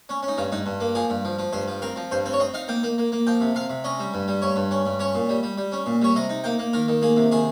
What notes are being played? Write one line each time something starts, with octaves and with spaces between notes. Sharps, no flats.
C#4
C#4
D#4
G2 F4
G2 D#4
G2
A#3
F3 G#4
G2
F3
F3
G2 C5
F3
C4 A#4
F3
G2 C5
C4 C5
C#5
C4 D#5
D#4 F5
A#3 G5
A#3
A#3
A#3
F3 G5
C3
C3 F5
C3
C#4 D#5
G3
G2
G3
G2 C#5
G2
C#4
G2
C#4 C#5
A#2
G3
G3
G3
C#4
A#2
G3 C#5
C3 D#5
D#4
A#3 G5
A#3
D#3 A#4
D#3
A#3 G#4
C3
D#3 G#4